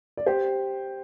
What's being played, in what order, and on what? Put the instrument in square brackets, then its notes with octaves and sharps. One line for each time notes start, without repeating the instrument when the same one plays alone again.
[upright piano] D5
G4 C5